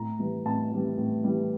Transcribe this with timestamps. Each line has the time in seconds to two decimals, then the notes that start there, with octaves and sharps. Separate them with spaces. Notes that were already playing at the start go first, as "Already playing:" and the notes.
Already playing: A2 A#5
0.19 E3 G3
0.45 A2 A5
0.72 E3 G3
0.97 A2
1.24 E3 G3